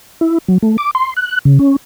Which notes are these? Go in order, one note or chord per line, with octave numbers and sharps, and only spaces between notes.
E4
F#3
A3
D6
C6
F#6
C#3
C#4